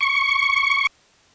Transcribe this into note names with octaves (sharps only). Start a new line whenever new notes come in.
C#6